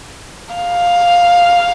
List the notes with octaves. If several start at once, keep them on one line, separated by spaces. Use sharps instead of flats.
F5